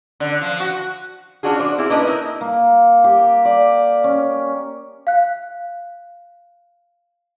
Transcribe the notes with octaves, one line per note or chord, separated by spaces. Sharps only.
D3
F3
F#4
E3 C#4 D4 F4 F#4 G#4
D4 C5 D5
C4 E4 F4 G#4 E5
A#3 C#4 D4 B4 D#5
D#4 E4 A#4
A#3
G4
D5
C#4
F5 F#6